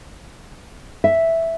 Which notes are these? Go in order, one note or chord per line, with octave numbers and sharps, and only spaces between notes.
E5